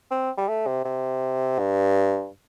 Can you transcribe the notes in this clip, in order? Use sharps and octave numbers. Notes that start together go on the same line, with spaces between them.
C4
G3
A3
C3
C3
G2